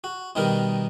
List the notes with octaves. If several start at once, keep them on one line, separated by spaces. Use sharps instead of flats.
F#4
B2 D#3 G3 D#4 A#4